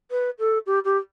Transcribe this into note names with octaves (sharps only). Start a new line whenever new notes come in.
B4
A4
G4
G4